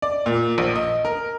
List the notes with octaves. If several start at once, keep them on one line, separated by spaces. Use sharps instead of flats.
D5
A#2
A#1
D#5
A#4